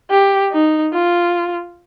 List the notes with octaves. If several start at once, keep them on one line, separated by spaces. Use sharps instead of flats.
G4
D#4
F4